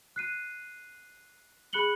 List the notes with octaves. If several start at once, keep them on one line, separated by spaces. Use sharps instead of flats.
F#6 C7 D#7
G#4 B5 F#6 C#7 F#7 G7